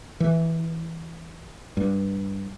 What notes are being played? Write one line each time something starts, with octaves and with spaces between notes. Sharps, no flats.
E3
G2